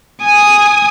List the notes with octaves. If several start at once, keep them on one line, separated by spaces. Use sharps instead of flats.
G#5 D#6